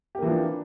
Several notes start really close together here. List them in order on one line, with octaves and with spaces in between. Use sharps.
G4 A#3 E3 F3 D4